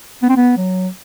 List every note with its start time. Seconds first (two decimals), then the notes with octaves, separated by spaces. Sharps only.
0.22 B3
0.29 C4
0.36 B3
0.57 F#3